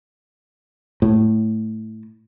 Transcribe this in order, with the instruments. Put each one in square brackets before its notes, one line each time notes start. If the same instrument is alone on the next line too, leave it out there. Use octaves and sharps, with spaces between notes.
[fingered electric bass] A2